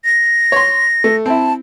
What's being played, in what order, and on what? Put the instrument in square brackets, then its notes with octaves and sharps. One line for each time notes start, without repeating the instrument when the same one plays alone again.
[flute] A#6
[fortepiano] C#5 C6
A3
[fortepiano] C4 E4 [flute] A5